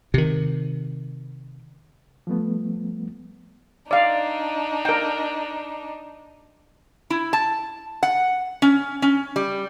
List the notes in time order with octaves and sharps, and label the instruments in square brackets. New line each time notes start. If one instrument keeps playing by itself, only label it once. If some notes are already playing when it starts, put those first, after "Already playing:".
[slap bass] C3 D#3
[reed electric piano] F3 G3 A3 B3
[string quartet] D4 D#4 [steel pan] D5 F5
[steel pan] A#4 G5
[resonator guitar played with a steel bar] E4
A5
F#5
C#4
C#4
G3